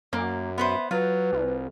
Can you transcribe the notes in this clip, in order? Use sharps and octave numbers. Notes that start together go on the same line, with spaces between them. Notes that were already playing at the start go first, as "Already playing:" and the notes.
F#2 A#3
B3 B4 C5 E5
F#3 F4 B4
C2